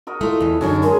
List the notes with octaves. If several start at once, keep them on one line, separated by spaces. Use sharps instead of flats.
F#4 A#4 D#5
A3 E4 F4 A4
E2 E3
F#2 D3 C#4 D#4 F#4 A#4 C#5
G#3 G#4 A#4